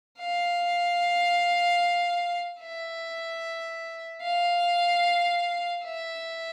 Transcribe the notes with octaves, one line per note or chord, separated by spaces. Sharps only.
F5
E5
F5
E5